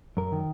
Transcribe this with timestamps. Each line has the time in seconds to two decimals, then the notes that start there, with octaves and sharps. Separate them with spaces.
0.17 F#2 A#4
0.32 D#3